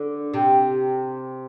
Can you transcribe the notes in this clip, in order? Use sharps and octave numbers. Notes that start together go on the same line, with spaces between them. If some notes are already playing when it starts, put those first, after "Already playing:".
Already playing: D3
C3